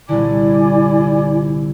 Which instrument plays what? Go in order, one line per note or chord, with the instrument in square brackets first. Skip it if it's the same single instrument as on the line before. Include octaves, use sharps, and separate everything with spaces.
[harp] C2 A#2 D3 [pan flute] E4 [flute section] D5 G#5 D6